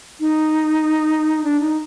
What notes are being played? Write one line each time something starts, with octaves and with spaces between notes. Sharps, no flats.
D#4
D4
D#4